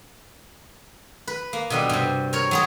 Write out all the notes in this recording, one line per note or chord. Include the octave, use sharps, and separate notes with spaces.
B4
A#3
B2 D3 G3
G2 C3
A#4 C#5
F#3 G#3 G#4